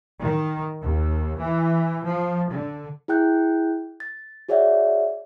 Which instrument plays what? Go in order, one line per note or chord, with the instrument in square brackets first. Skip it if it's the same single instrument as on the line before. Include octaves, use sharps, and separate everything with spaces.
[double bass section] D#3
D#2
E3
F3
D3
[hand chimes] E4 G#4 G5 F#6 G6
A6
F#4 G#4 C#5 D5 E5 F#5